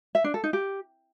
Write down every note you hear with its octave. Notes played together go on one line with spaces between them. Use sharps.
E5
D4
A4
D#4
G4